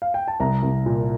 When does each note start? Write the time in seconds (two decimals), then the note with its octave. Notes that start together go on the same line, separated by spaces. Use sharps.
0.02 F5
0.14 G5
0.28 A5
0.40 C2 A#5
0.63 C2
0.86 A#2